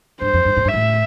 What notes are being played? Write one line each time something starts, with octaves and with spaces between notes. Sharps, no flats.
G2 C5
F2
G2
A2
G2
E5
A2